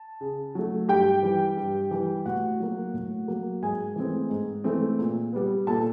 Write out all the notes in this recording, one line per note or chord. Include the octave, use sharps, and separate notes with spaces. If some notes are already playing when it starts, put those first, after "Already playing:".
Already playing: A5
C#3
F#3 A3
G2 G4 G5
E3 G3
G2
E3 G3
A2 F#4 F#5
F#3 A#3
A2
F#3 A#3
G#2 G#4 G#5
E3 A3 C4
G#2
E3 A3 C4
A#2
G3 B3
A#2 A4 A5